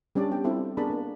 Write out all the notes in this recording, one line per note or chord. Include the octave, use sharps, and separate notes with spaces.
G3 C#4 D4 D5
B3 G4 G5
C4 E4 F4 A4
B3 D4 G#4 A#4 A5 B5
A#3